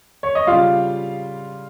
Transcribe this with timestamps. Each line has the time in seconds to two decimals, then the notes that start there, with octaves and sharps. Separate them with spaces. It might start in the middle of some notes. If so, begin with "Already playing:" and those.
0.23 C#5
0.35 D#5
0.47 C#3 G3 F4 F5